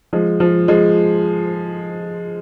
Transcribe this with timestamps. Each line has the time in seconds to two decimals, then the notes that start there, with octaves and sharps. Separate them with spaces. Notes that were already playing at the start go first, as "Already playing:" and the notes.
0.13 F3 G#3
0.40 F3
0.68 F3 G#3